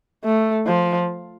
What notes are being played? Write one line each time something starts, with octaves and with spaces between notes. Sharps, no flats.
A3
F3